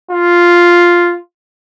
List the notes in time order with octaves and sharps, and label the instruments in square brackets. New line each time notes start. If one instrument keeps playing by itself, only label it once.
[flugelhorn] F4